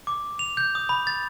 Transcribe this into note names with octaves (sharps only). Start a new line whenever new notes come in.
D6
F7
G6
D#6
B5
A6